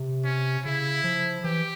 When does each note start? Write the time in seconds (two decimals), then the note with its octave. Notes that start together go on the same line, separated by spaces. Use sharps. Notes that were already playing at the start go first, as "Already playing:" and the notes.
Already playing: C3
0.24 C#4
0.65 C#3 E4
1.04 F3
1.44 E3 G4